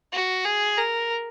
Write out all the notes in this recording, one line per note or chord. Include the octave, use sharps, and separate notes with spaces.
F#4
G#4
A#4